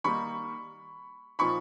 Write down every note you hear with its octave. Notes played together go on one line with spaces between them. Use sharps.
D#3 G3 A#3 D#4 B5 C#6
A#2 F3 A#3 D#4 B5 C#6